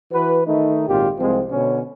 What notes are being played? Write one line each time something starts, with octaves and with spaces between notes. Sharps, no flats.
E3 F#4 B4
D#3 A3 D#4
G#1 A#2 F4 G4
C2 F3 G#3 C4
B2 D3 C#4